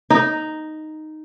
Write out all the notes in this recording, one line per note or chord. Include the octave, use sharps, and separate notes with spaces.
D#4